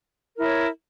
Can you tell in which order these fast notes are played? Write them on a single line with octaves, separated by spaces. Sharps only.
A#4 E4 C#5